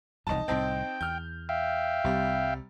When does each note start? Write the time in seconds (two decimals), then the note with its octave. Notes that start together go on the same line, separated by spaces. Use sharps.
0.27 E1 C2 F2 D#4 A5
0.48 C2 A2 C4 D#4 G5 A5
1.01 E2 F6 G6
1.49 E5 F5 G5
2.04 C2 C3 G3